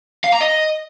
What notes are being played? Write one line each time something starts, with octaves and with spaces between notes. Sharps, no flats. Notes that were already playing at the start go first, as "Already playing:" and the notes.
F5
A#5
D#5